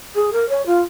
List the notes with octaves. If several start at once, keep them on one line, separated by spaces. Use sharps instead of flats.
G#4
A#4
C#5
F4